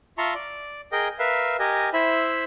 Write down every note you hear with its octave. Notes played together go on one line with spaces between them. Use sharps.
F4 E5 A5 A#5 C6 C#6
D5
G#4 A#4 D#5 G5
A#4 B4 E5 F5
G4 A#4 D#5 G#5
E4 C5 E5 B5